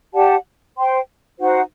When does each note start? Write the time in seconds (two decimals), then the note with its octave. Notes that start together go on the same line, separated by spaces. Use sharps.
0.14 G4 D5 F#5 A5
0.76 C5 G5 C6
1.39 D#4 F#4 C5 F#5